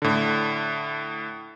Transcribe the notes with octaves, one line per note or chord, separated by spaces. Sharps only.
A2 D3